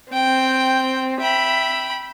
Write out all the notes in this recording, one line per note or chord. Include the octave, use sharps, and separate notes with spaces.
C4 G5
E5 G5 B5